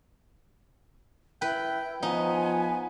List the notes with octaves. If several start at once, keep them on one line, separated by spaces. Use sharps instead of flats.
E4 B4 G5
F3 B3 D#4 G#5